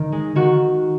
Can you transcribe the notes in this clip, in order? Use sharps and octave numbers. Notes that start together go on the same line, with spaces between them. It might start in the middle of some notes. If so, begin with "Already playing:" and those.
Already playing: D#3
G#3
D#3 F#4